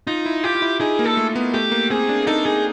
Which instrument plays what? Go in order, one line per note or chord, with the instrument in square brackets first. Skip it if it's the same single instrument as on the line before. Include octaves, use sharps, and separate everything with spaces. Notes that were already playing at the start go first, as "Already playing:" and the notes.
[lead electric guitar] D#4 [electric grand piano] F4
[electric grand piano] E4
[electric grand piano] F4 [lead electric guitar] G4
[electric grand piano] F4
E4
[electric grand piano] D#4 [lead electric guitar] G#4
[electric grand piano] A#3
[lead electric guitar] A4
[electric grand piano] A3
B3
[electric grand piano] A3 [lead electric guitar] G4
[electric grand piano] A#3
[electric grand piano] C4 [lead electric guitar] G#4
[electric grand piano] D4
[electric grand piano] D#4 [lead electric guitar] A4
[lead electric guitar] G#4